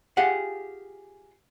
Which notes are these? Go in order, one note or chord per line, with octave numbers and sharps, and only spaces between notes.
F4 G4 G#4 F#5